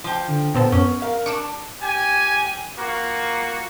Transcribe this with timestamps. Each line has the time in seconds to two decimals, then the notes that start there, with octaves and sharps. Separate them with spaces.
0.04 F3 G5
0.28 D3
0.54 A#2 B3 C4 A4
0.72 F#2 C#4
1.02 A#4 F5
1.26 D4 C#6 D6 E6
1.81 G4 G#5
2.78 A#3 F4 F#4